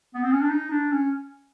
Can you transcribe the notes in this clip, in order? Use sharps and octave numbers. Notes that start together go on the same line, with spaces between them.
B3
C4
C#4
D4
D#4
D4
C#4